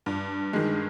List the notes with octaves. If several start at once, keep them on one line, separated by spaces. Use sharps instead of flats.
G2
D#3 G#3